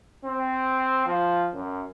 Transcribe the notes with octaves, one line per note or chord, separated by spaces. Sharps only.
C4
F3
F#2